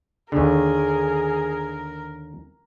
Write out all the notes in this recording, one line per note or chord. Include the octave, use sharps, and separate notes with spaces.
D#2 D3 G#4 A#4